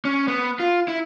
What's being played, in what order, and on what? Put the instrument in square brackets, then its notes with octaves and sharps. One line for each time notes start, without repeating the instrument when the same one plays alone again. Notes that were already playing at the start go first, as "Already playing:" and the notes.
[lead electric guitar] C#4
B3
F4
E4